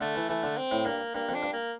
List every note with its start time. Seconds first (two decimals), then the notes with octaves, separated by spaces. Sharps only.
0.01 D3 A3
0.16 E3
0.29 E3 A3
0.43 D3
0.57 C4
0.71 A2
0.86 G2 A#3
1.15 G2 A#3
1.29 F2
1.34 D4
1.43 G2
1.53 A#3